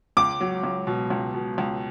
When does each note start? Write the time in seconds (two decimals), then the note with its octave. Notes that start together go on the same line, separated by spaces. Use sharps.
0.17 C#2 D6
0.41 F#3
0.63 C#2
0.87 B2
1.10 C#2
1.34 B2
1.58 C#2